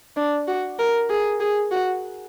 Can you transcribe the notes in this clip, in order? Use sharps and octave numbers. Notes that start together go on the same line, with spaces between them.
D4
F#4
A#4
G#4
G#4
F#4